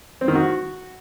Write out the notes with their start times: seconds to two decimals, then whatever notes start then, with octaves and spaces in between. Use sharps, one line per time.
0.21 C4
0.28 D#3
0.35 F#4